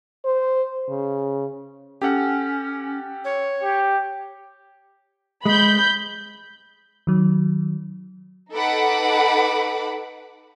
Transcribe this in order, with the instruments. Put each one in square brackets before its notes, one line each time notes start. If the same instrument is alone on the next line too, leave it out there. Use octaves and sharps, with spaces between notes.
[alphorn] C5
C#3
[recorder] C#4 [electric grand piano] G4 A4 F#5
[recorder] C#5
[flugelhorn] G4
[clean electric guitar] G#3 [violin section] B5 G6
[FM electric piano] D#3 F#3
[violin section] D#4 A4 B4 F#5 B5 D6